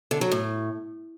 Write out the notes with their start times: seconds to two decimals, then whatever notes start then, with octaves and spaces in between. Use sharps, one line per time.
0.11 D3
0.21 F#3
0.32 A2